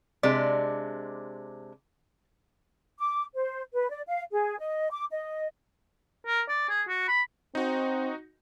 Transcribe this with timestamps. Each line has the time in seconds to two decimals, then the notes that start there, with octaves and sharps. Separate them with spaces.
0.23 C3 G#3 D4 D5
2.99 D6
3.35 C5
3.73 B4
3.90 D5
4.07 F5
4.32 G#4
4.59 D#5
4.91 D6
5.11 D#5
6.27 A#4
6.49 D5
6.69 G#4
6.88 F#4
7.08 B5
7.55 C4 D#4 F#4